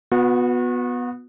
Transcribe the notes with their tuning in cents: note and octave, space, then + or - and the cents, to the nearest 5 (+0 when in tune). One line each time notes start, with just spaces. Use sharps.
B3 +0 F#4 -35